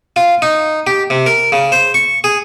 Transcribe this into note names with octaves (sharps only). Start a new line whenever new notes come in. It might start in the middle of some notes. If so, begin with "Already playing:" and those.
F4
D#4
G4
C3
A#4
C#3
C5
C#6
G#4